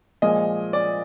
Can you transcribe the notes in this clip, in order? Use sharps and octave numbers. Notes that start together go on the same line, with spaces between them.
A#2 F3 G#3 D#5
D5